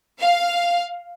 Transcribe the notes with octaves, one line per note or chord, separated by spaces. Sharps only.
F5